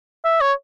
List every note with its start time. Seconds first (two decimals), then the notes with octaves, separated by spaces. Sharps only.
0.25 E5
0.41 C#5